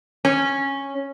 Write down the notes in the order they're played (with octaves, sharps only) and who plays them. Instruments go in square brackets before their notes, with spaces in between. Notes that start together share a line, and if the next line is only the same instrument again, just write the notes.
[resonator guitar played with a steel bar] C#4